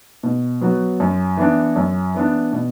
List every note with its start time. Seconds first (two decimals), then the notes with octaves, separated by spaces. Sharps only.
0.23 B2
0.61 F#3 B3 F#4 B4
1.00 F#2
1.37 E3 B3 D4
1.76 F#2
2.15 E3 B3 D4
2.53 B2